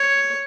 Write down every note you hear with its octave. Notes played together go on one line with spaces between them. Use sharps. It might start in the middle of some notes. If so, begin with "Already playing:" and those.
Already playing: C#5